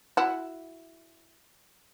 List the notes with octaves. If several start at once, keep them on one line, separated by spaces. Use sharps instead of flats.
E4 F#4